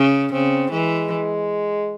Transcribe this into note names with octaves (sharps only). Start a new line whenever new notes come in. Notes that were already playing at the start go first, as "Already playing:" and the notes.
Already playing: C#3
C#3 C4
E3 G#3